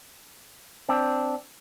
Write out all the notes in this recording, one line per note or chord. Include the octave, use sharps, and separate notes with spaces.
C4 D4